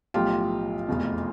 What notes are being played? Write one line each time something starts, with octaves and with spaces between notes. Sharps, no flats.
B1 A2 F3 F4 G4
F1 E2 B2